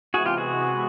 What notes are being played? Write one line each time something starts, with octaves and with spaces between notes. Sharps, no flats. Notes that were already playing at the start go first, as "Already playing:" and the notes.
C3 E3 G#3 B3 F#4 G#4
F4 G4
F#4 G#4